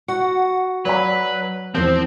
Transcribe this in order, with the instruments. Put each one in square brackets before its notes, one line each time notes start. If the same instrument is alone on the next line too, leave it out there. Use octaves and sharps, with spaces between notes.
[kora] F#4 [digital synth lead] F#5
[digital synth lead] F#3 [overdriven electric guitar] B4 [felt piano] D5 F#5 B5
[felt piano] E2 C5 G6 [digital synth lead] F3 [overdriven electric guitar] C4